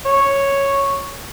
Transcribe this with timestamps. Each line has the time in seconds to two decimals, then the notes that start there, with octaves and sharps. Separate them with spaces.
0.06 C#5